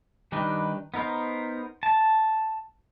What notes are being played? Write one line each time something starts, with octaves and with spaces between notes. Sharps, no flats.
D#3 G3 D4 D#4 B4
B3 D#4 A#4 C5
A5